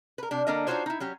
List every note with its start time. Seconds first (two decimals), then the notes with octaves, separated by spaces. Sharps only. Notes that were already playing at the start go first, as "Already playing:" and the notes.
0.18 A#4 B4
0.31 C3 D4
0.47 D3 A#3 D4 A#4 D#5
0.67 D4 D#4 F4 F#4 C5 C#5
0.86 D#4 E4
1.00 F#3 C#4 G4